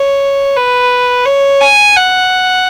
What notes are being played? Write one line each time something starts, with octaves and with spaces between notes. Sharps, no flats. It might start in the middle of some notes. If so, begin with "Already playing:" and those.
Already playing: C#5
B4
C#5
G#5
F#5